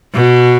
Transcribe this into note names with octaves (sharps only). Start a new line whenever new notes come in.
B2